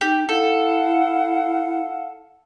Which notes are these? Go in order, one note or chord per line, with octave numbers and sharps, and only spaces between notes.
D#4 G4
E4 A4 F5 F#5